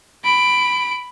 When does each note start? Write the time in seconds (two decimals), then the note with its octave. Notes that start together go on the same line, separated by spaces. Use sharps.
0.25 B5 D7